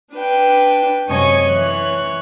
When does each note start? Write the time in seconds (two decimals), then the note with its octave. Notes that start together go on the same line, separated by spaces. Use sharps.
0.14 D4 B4 G5
1.08 F#2 C3 C#5 D#5 G#5 C#6
1.48 E3 C#5 F#6